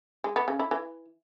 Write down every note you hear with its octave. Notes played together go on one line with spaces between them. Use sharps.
G#3
B3
C#3
E4
E3